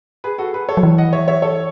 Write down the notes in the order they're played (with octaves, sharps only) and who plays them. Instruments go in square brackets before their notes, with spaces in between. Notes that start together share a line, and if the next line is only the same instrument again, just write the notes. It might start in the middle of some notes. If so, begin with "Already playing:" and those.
[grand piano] G#4 B4
F#4 A4
G#4 B4
A4 C#5
[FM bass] F#3
E3
[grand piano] D#5 F#5
C#5 E5
C#5 E5
A4 C#5